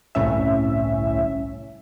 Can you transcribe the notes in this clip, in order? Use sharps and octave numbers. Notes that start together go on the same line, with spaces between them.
G1 C2 A2 C#4 E5